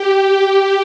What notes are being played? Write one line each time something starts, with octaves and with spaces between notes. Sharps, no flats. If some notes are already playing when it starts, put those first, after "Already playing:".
Already playing: G4